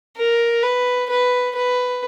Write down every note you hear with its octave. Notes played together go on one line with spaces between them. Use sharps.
A#4
B4
B4
B4